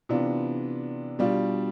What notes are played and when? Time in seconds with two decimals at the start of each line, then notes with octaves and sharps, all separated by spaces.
0.09 C3 E3 B3 D4 F4
1.19 B2 G3 D4 F4